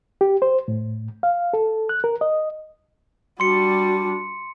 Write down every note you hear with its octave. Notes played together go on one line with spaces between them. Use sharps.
G4
C5
A2
F5
A4
F#6
A#4
D#5
G3 D4 F#4 C6 C#7